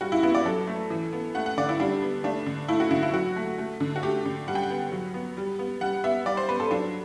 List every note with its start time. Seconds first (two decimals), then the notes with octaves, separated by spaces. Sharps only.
0.01 G3 F#4
0.12 E4
0.23 B3 E4
0.35 D5
0.45 F#3 A4
0.67 A3
0.90 E3
1.13 B3
1.35 A3 F#5
1.46 F#5
1.57 D3 D5
1.69 E4
1.80 G3 D4
2.02 B3
2.24 A3 D4
2.46 D3
2.68 A3 E4
2.80 F#4
2.91 D3 E4
3.03 E4
3.13 F#3 F#4
3.36 A3
3.58 A3
3.80 D3
3.96 F#4
4.03 A3 G4
4.25 D3
4.48 G3 F#5
4.55 G5
4.63 F#5
4.70 B3
4.92 F#3
5.14 B3
5.37 G3
5.59 B3
5.81 G3 F#5
6.04 B3 E5
6.26 G3 D5
6.37 C5
6.49 B3 B4
6.60 A4
6.71 F#3 D4